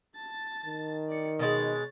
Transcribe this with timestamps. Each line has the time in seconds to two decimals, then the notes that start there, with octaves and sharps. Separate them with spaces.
0.16 A5 A6
0.65 D#3
1.09 D5 C#7
1.39 B2 E3 G#3 C#5 A6